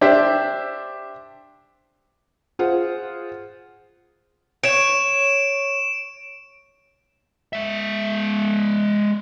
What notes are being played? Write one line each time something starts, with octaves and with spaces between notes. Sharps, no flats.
D4 G4 C5 E5
F4 G#4 C5 F#5
C#5 D7 E7
G#3 E5